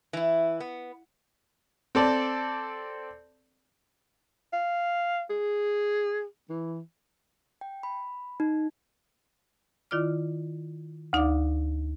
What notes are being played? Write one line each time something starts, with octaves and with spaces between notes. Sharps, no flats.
E3 E4
B3
C4 A4 D5
F5
G#4
E3
G5
B5
D#4
D#3 E4 F4 D5 D6 F6
D2 D#4 D5 F5 D6